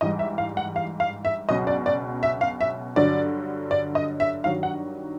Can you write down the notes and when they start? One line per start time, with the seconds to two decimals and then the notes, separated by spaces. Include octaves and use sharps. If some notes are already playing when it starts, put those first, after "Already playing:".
0.01 G#2 E3 G3 D#5
0.19 E5
0.38 F5
0.57 F#5
0.76 F5
1.00 F5
1.25 E5
1.49 C#2 B2 F#3 D#5
1.67 D5
1.86 D5
2.23 E5
2.41 F5
2.61 E5
2.96 G2 D3 F#3 D5
3.71 D5
3.95 D#5
4.20 E5
4.44 G2 D#3 F#3 F5
4.63 F#5